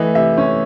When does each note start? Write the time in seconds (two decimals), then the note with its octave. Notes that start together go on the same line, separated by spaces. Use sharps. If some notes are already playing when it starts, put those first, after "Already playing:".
Already playing: E3 A3 D#5
0.15 C3 E5
0.37 C#4